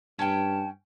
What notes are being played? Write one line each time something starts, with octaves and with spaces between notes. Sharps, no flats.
G2 C#4 G5 A5